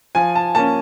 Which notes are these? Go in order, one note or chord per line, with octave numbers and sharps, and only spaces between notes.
F3 G#5
A5
A#3 C#4 A5